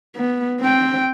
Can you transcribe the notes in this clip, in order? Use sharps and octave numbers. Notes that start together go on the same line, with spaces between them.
B3
C4 G5